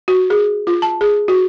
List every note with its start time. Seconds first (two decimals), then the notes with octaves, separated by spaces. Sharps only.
0.08 F#4
0.30 G#4
0.67 F4
0.82 A5
1.01 G#4
1.28 F#4